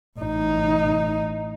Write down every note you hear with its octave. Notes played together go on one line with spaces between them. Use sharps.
A1 D#4